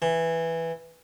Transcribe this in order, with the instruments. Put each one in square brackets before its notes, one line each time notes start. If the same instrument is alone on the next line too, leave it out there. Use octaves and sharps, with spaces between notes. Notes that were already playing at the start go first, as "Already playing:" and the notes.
[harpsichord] E3